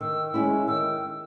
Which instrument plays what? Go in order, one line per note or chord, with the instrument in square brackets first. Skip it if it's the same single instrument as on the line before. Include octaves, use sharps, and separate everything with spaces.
[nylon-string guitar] D#3 [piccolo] E6
[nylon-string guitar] G#3 C#4 E4
[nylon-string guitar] D#3 [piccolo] E6